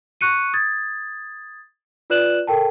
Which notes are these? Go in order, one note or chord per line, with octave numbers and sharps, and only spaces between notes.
C#6 F#6 C#7 D#7
D#6 G#6 A6
F4 B4 D5 F#6 E7 F#7
A4 A#4 G5 A5